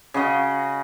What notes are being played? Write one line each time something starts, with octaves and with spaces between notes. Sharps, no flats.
C#3 F#4 D#5